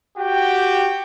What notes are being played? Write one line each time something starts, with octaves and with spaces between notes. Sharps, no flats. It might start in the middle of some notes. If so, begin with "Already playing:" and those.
F#4 G4 G5